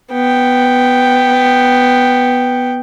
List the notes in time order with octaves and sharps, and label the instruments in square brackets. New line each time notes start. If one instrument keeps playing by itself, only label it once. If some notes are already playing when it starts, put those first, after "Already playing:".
[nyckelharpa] B3 G5